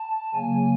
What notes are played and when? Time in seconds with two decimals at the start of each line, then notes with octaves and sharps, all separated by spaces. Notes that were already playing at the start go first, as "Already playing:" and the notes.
Already playing: A5
0.34 C#3 F#3 A#3 G#5